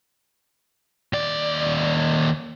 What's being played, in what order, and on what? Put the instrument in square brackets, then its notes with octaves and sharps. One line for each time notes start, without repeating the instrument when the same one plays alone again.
[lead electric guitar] D#2 D5